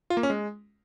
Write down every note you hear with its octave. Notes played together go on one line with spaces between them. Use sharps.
F4
A#3
C#4
G#3